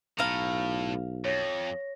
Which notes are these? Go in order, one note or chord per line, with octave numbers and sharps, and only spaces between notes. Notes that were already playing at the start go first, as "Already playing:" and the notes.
B1 A2 F5 A#5
F2 C#5 A#6